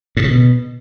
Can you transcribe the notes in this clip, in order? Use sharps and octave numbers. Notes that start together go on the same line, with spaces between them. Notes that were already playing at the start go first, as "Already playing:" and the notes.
A2
C#3
B2